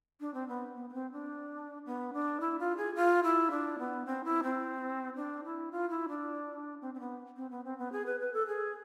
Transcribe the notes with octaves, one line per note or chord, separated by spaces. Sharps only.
D4
C4
B3
B3
B3
C4
D4
B3
D4
E4
F4
G#4
F4
E4
D4
B3
C4
E4
C4
D4
E4
F4
E4
D4
C4
C4
B3
C4
B3
C4
B3
G#4
B4
B4
A4
G#4